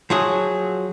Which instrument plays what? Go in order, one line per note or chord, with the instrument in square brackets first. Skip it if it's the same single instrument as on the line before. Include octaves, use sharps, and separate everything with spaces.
[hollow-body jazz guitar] F3 F#3 G#4